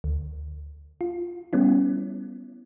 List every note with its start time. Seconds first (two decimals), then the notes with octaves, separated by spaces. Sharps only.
0.04 D2
1.01 F4
1.53 G3 B3 C#4 E4